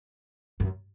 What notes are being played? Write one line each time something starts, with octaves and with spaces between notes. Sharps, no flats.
F#2